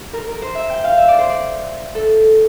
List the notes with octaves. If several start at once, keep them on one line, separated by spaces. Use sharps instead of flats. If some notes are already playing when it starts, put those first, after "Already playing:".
Already playing: G4
A#4
A#4
C5
E5
G5
F5
E5
D5
C5
D5
A4